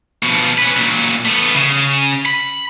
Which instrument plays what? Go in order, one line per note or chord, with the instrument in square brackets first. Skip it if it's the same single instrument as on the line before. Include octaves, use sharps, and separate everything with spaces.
[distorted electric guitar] B2 F3
C#4 B4
A#2 F#3
A3 B3
C#3
B5